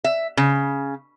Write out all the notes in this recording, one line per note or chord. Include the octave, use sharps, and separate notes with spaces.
E5
C#3